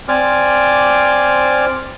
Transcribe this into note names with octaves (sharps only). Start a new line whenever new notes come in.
C4 C5 D5 G#5 D6 F6